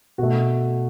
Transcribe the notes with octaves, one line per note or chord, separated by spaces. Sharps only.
B2 A3 F#4